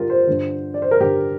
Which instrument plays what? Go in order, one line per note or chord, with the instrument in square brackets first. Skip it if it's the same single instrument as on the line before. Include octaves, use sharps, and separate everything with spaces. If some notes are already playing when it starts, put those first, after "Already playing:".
Already playing: [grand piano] G2 D3 F4 G4 A#4
C5
G2 D3
D5
C5
A#4
G2 D3 G4